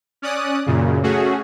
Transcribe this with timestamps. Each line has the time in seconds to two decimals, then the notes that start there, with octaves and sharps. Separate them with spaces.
0.22 C#4 D5 D#6 F#6
0.66 F#2 A#2 C#3
1.03 A3 C#4 F#4 G#4